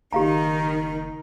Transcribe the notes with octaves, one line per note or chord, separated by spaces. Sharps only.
F#1 D#3 D#4 G4 F5 A#5